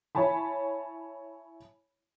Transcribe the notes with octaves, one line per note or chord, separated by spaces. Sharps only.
E4 C#5 G#5 A5 B5